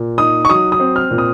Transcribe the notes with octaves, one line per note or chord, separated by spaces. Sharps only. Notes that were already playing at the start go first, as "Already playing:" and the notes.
Already playing: A#2
D#4 D#6
C#6
F#3 D#6
D#6
C4
F6
A#2
D#6